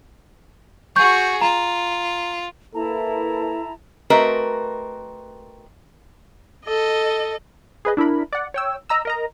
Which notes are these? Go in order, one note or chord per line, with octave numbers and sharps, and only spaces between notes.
F#4 G#4 C#6 G6
F4 A#5
A#3 E4 A4 B4 A5 A#5
A3 C4 F#4 A#4 B4 D#5
A4 D#5
G#4 B4 D#5
D4 E4 A#4 B5
D5 F#5
C#5 G5 E6
D#5 A#5 E6
A#4 D#5 A#5